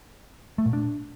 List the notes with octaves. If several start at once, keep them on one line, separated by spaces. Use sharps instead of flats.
A3
A#2
D4